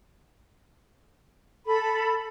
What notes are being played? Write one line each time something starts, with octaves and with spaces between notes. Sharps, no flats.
A4 B5